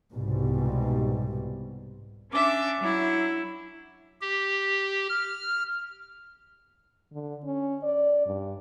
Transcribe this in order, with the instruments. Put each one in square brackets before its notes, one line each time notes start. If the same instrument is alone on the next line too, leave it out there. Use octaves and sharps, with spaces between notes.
[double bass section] C2 G#2 B2 G3
[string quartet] C#4 D4 E5 D6
F#3 E4
[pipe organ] G4
F6
[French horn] D3
C#4
D5
G2